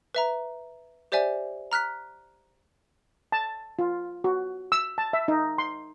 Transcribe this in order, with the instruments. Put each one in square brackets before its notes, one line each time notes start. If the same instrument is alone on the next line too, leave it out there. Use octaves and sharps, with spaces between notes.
[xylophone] B4 E5 A#5
G4 C5 D5 E5 G#5
A#5 F6 F#6 B6
[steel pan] A5
F4
F#4
E6
A5
E5
D#4
C6